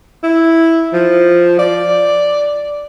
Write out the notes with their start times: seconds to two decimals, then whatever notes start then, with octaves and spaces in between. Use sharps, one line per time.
0.23 E4
0.93 F3
1.59 D5